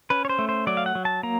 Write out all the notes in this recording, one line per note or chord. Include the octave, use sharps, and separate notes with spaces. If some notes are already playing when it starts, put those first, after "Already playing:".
C#4 B4
C#5
C5
A3
C5
F#3 D5
F5
F#5
F#3
A5
A#3 A#5